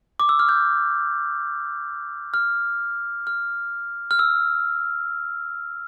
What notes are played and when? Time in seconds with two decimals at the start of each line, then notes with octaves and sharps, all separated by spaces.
0.20 D6
0.29 E6
0.39 F6
0.49 G6
2.34 F6
3.27 F6
4.11 F6
4.19 E6